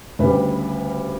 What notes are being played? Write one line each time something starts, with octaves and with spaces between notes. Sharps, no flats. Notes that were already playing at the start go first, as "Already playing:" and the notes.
D2 C#3 G3 B4